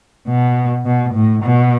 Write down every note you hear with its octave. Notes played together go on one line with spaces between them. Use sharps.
B2
B2
A2
B2